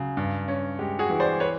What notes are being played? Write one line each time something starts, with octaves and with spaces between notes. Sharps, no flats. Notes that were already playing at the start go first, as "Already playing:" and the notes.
Already playing: C#3 F#3
G2
C#4
G#3 G4
F#4 G#4
E3
C5 D5
B4 C#5